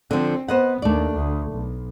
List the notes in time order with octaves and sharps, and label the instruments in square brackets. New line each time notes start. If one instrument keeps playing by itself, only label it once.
[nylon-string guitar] D3 F3 [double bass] C4
[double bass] B3 [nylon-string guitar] C5 D#5 F#5
[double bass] D#2 D4 [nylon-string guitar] A3 D5
[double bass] D2
B1